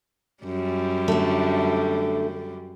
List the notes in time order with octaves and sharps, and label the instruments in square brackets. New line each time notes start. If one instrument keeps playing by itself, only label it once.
[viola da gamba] F#2 G3
[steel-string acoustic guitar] D3 A3